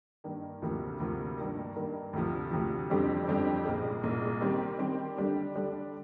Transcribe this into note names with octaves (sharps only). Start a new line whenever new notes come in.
G2 D#3 A#3
D2 C3 F3 A#3
D2 C3 F3 A#3
G2 D#3 A#3
G2 D#3 A#3
D2 C3 F3
D2 C3 F3
F2 D3 G3 C4 G4
F2 D3 G3 C4 G4
C2 A#2 G#3
C2 A#2 G#3
D#3 G3 C4 G4
D#3 G3 C4 G4
D3 G3 D4
D3 G3 D4